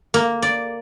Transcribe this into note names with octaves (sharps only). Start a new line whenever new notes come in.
A#3
D5